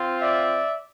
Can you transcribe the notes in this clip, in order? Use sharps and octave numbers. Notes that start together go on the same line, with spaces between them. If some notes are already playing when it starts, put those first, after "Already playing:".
Already playing: C4 F4
D5 E5